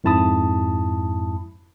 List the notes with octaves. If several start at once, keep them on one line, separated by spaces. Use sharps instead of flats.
F2 G#2 E4 A5 B5 D#6